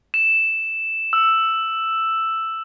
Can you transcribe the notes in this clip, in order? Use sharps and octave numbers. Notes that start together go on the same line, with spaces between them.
E7
E6